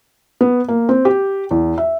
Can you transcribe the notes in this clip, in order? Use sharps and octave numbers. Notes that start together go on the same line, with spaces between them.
B3
A#3
C4
G4
E2
E5